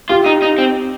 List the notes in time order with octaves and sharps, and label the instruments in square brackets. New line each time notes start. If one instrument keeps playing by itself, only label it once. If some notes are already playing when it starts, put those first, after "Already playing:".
[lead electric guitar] F4 [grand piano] G4
[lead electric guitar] D#4
D#4
C4